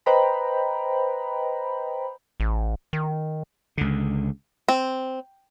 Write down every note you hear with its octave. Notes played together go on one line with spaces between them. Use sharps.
B4 C5 D#5 G5 A#5 B5
A1
D#3
C#2 D3
C4